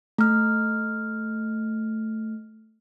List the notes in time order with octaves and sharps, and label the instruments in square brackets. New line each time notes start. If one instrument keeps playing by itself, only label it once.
[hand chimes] A3 F6